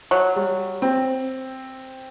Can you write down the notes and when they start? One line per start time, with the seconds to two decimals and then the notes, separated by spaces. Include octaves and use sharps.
0.11 F#3
0.36 G3
0.82 C4